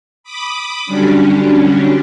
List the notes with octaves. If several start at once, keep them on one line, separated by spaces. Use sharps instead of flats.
B5 D6 D#6
D3 F#3 G3 C#4 D4